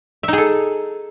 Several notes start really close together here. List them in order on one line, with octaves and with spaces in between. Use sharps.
E5 D#4 G#4 A4